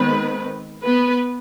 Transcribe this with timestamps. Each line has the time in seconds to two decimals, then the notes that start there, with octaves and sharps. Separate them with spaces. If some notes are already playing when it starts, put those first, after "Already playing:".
Already playing: D#3 G#3 B3 C4 B4
0.84 B3 B4